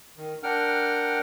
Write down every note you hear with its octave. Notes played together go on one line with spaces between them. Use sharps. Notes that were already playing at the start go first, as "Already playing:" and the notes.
D#3
D4 A#4 F#5 G5 F6